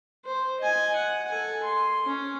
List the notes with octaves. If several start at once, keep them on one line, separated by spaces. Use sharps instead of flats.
C5
D#5 G#5
F#5
A4 G#5
C6
C#4